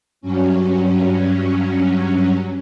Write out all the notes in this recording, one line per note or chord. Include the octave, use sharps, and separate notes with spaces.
G2 F#3 C#4